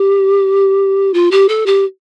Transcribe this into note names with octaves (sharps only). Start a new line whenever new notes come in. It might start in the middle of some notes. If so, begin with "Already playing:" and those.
Already playing: G4
F4
G4
A4
G4